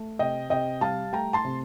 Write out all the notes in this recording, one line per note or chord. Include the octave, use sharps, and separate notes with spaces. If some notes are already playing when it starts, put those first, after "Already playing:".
Already playing: A3
C3 D#5 G5
C3 D#5 G5
G3 F5 A5
A3 G5 A#5
A5 C6
C3